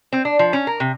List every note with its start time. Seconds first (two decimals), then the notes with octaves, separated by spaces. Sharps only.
0.13 C4
0.25 D4
0.39 F3
0.53 C#4
0.67 A#4
0.80 C3